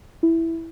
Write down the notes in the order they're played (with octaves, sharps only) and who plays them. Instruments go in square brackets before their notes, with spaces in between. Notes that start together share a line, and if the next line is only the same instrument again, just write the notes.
[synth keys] E4